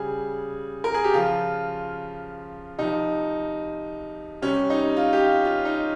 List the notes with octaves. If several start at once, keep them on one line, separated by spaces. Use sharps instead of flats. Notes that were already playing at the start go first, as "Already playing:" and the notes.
Already playing: C#3 G3 G#4
A#4
G#4
G4
C#3 F3 F4
C3 F3 D#4
C3 G3 C#4
D#4
F4
G4
F4
F4
D#4